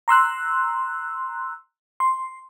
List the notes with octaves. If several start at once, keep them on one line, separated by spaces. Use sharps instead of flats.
A#5 C6 E6 F#6
C6